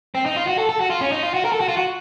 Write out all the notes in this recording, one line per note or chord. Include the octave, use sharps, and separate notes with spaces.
C4
D#4
F4
F#4
A4
A4
F#4
F4
C#4
D#4
F4
F#4
A#4
A4
F#4
F4
F#4